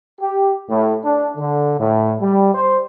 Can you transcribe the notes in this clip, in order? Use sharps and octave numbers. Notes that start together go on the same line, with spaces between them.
G4
A2
D4
D3
A2
G3
C5